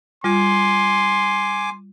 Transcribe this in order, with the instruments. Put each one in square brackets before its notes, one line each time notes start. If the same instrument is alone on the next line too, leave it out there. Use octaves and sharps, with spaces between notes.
[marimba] G3 F4 [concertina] G#5 D6 [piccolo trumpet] C6